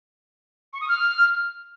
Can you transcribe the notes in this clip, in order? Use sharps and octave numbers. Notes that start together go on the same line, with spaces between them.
C#6
D#6
F6